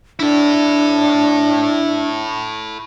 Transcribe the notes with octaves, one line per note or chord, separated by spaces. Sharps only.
D4 E4 A4